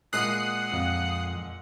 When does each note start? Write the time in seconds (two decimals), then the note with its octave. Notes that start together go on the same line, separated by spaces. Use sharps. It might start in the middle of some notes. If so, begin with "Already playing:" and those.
0.13 A#2 G#3 F#5 D#6 F#6 C7
0.73 F2